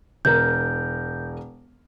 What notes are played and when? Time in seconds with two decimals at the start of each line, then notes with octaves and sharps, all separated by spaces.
0.25 E1 A#4 G6